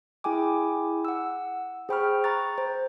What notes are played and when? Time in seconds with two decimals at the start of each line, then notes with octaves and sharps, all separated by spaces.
0.24 E4 G#4 G5 G#5 D6
1.05 F#5 E6
1.89 G#4 C5 G5 B5 C#6 F6
2.24 A#5 C#6 F#6 A6
2.58 C5